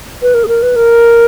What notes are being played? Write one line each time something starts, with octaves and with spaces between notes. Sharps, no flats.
B4
A#4
G#4
A#4
B4
A#4